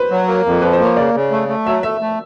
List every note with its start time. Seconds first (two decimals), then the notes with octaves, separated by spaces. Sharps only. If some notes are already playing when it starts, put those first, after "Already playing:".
Already playing: B4 C5
0.11 F#3
0.28 A#3
0.45 F2
0.62 F3 B4
0.73 C5
0.80 A#3
0.85 C#5
0.97 C#3 D5
1.14 C#3
1.31 A3
1.48 A3
1.66 F#3 E5
1.83 A3 E5
2.01 A3